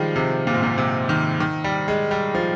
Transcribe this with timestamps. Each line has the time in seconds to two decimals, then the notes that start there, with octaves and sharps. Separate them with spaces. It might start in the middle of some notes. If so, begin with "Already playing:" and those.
Already playing: D#3 F3 G3 G#3
0.16 C3
0.47 A#2
0.54 G#2
0.63 A#2
0.78 C3
1.09 D#3
1.40 D#3
1.64 G3
1.88 G#3
2.11 G3
2.35 F3